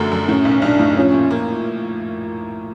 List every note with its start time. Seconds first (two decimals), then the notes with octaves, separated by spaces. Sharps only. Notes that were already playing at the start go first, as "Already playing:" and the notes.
Already playing: F#2 D3 A3
0.12 F#2
0.29 A2 C#4
0.45 B1
0.62 B1 D4
0.80 A2
0.96 F3 C#4
1.14 A#2
1.31 A#3